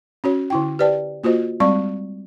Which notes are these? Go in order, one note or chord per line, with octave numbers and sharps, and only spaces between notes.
C#4 F#4 C#5
D3 E4 G5
G4 B4 C5 D5 G5 A5
A#3 F4 F#4 C5 D#5
G3 G#3 C4 D5 C#6